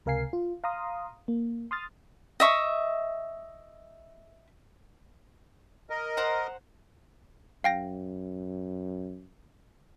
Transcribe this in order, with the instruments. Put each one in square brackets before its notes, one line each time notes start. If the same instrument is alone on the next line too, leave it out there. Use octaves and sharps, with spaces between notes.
[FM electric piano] C#2 C3 A#4 F5 G#5 C7
F4
F5 A#5 C6 D#6
A#3
C6 D#6 F6 A6
[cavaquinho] D#5 E5 C#6
[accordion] A#4 D#5
[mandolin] C5 F#5 A#5
[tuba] F#2 [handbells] F5 G5 A#6